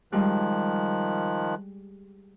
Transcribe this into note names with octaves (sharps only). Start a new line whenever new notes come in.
D#3 F3 G3 G#3 F#6